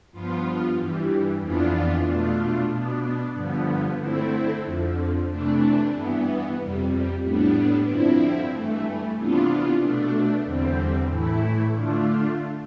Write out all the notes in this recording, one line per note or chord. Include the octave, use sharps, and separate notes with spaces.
G2 F3 B3 F4
G2 E3 G3
F2 E3 B3 D4 F4
B2 A3 D4 F4
B2 B3 D4
G2 D3 F3 B3
D3 A3 C4 E4
F2 D3 F3
C3 E3 A3 D4
G2 E3 B3
F2 C3 G3
A2 G3 B3 D4
G2 D3 F3 C4 E4
G2 E3 A3
C3 E3 B3 D4 F4
B2 A3 D4
E2 D3 G3 C4
A2 E3 A3 E4
D3 A3 D4 F4